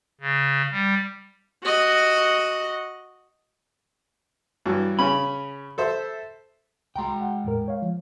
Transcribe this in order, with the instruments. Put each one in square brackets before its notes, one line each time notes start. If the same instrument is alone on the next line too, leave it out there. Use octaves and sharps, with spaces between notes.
[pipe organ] C#3
G3
[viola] F#4 D#5
[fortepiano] G2 E3 F#3
[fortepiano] C#3 C#4 [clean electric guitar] B5
[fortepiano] A4 C5 E5
[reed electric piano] C2 A#5 C6 [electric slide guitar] G#3 G5
[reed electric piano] F#5
E2 A2 A#4
C#5 F5
F3